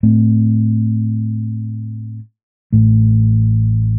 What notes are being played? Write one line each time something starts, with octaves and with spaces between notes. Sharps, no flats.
A2 A3 C4
A1 A2 A3